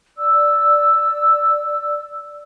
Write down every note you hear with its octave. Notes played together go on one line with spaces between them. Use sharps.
D5 E6